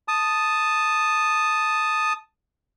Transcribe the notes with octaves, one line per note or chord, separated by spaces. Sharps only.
A5 D#6